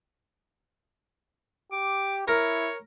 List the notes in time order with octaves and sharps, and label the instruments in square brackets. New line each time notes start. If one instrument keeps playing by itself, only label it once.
[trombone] G4 [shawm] D6
[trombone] E4 [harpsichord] A#4 [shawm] C#5